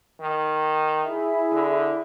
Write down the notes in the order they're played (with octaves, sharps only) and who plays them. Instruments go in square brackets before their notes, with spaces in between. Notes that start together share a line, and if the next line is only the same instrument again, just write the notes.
[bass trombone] D#3
[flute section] E4 G#4 E5
[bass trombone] D3